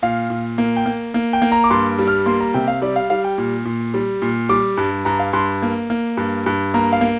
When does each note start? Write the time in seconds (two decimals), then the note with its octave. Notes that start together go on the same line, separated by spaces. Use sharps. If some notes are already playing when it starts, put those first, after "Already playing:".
0.02 A#2 F5
0.30 A#2
0.58 A#3
0.76 G5
0.86 A#3
1.14 A#3
1.33 G5
1.42 A#3
1.52 A#5
1.64 D6
1.70 G2 C6
1.99 G3
2.07 F6
2.26 A#3 C6
2.40 A#5
2.54 C3 G5
2.68 F5
2.82 G3 D5
2.96 F5
3.10 G3 F5
3.24 G5
3.38 A#2
3.65 A#2
3.94 G3
4.22 A#2
4.49 G3 D6
4.78 G2
5.05 G2 A#5
5.19 F5
5.33 G2 C6
5.62 A#3
5.90 A#3
6.17 G2
6.46 G2
6.74 A#3 A#5
6.92 F5
7.01 A#3